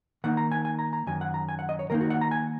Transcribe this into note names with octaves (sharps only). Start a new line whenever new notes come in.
D#3 A#3 D#4 F#5
A#5
G#5
G#5
A#5
A#5
F#2 D#3 G#5
F#5
A#5
G#5
F#5
D#5
C#5
D#3 A#3 D#4 A#4
F#4
F#5
A#5
G#5